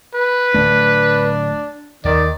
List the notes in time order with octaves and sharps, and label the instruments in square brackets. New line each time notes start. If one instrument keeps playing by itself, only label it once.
[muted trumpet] B4
[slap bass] D1 A3 [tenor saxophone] D4
[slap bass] D#2 [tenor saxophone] D#3 [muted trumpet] D5